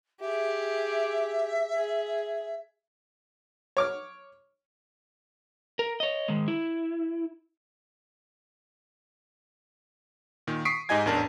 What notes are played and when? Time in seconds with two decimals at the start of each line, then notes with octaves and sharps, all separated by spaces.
0.21 G4 G#4 E5
1.75 G#4
3.77 C#5 D6 F6
5.79 A#4
6.00 C#5 D#5
6.28 D#3 G#3
6.48 E4
10.47 A#2 D#3
10.65 C#6 D#6 B6 C7 D7
10.89 G#2 D#4 G4 D#5 G#5 G#6
11.06 A1 E2 D4 A#4 A5